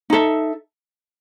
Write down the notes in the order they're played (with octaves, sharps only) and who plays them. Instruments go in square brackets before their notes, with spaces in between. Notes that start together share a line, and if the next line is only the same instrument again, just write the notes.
[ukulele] D#4 A4 E5